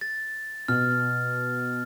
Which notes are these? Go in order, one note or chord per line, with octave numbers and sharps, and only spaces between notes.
A6
B2 F6